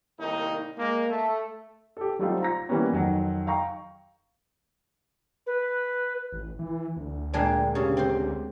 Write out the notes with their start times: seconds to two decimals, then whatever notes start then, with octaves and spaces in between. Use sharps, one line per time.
0.19 C2 A2 D#3 A#3 D#4
0.77 G#3 A#3
1.09 A3
1.97 G4 A4
2.19 F#3 G3 A3 C4 D#4 F4
2.41 F4 A#5 A#6
2.69 E3 G3 A#3 B3 C#4
2.92 F2 D#3 F#3
3.47 F5 G5 A#5 C#6
5.46 B4
6.32 A1
6.59 E3
6.97 D2
7.33 A#2 G#3 D4 G5
7.75 C#3 G4
7.97 C4 C5